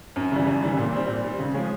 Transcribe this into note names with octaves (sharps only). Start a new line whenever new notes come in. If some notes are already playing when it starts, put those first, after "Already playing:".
F#2
C#3 E3 G3
F#2
C#3 E3 G3
A#2
G3 C4
A#2
G3 C4
C#3
F3 G#3 C#4